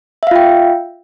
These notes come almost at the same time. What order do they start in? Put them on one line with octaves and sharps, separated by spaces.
E5 F5 F4 G5